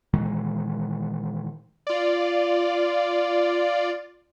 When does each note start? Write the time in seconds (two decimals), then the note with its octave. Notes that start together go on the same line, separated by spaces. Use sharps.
0.14 A#2 D#3 E3 G#3
1.87 F4 D5